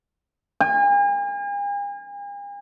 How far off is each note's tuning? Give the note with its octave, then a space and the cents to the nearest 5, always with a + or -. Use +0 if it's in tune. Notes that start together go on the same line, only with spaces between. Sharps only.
G#5 -45